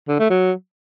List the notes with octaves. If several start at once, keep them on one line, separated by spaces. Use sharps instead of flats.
D3
A3
F#3